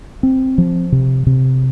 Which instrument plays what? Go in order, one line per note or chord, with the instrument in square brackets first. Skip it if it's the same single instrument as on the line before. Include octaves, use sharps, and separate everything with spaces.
[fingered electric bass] C4
F3
C3
C3